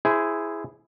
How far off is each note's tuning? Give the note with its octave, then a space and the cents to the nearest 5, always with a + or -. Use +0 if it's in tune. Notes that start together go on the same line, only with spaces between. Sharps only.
E4 +0 G#4 +0 C5 -20